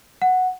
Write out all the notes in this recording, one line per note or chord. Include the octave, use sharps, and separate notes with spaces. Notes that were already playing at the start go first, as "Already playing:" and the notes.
F#5